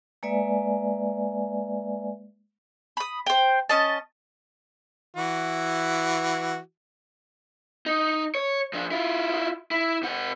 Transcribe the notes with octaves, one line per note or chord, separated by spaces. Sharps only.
G#3 A#3 B4 D5 E5 G#5
B5 D#6
C5 G5
C#4 D#5 A5
E3 E4 F#4
D#4
C#5
F3 D4
E4 F4
E4
C3 F#5